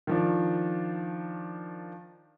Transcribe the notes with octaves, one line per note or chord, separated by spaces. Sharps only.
D#3 F3 D4